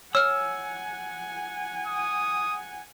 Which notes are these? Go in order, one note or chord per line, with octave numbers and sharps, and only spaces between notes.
C#5 F#5 G#5 E6 F6
D#6